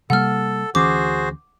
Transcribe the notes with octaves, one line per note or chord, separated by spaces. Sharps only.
C3 G3 A#3 A4 F#5 F6
D2 E3 C#4 F#4 G#4 C5 D6